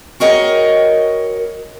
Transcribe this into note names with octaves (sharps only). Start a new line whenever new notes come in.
F#4 G#4 A#4 C#5 D#5 G5